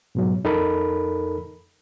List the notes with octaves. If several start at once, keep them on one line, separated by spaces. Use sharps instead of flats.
G#2 B2 F#3
F2 D#4 A4 A#4 B5